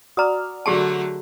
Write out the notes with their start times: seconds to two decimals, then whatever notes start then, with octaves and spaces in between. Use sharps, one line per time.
0.17 F#4 D5 A#5 D#6 F6
0.66 D3 F#3 A3 G4 G#4 A5